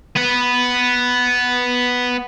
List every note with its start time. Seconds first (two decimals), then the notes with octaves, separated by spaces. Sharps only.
0.16 B3 B4